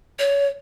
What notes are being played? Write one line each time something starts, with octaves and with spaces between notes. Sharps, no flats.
C#5